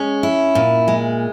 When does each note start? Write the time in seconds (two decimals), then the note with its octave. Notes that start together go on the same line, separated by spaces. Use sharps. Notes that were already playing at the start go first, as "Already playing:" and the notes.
Already playing: G#3 C#4
0.23 E4
0.55 A#2
0.88 G#3